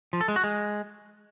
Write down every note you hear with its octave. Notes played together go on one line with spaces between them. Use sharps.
F3
A4
G#3
F#4
G#3